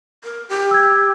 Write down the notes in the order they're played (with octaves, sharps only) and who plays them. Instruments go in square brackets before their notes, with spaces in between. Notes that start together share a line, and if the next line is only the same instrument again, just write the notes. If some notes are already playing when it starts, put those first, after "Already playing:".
[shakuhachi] A#4
G4
[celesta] E6 G#6